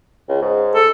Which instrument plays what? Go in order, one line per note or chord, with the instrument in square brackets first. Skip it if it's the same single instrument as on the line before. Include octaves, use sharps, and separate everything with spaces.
[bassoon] C#2
G#2
[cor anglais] A4